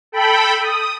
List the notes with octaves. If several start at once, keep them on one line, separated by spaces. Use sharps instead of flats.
A4 G5 B5
D#6